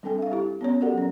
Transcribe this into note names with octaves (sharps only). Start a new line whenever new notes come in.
G3 C4 D4 A4 G5 G#5
E5 F5
E4 G4
B3 C#4 C#5
F#4 G4 A4 A#4 D5 F#5
F#3 C#4